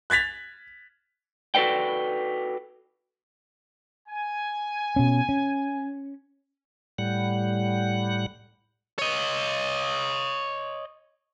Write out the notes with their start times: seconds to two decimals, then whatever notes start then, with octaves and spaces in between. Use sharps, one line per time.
0.10 F#6 G#6 A6 B6 F7
1.55 F#4 A4 B4 D5 G5
4.09 G#5
4.96 B2 C#4
5.29 C#4
6.98 A2 G3 F#5
8.99 C#5 D#5